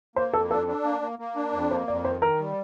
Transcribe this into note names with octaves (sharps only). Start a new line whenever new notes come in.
A#3 C5
F2 A4
D4 A4
D4
A#3
A#3
A#3
D4
F2
A#3 C5
F2 D5
D#3 C5
D#3 A#4
G3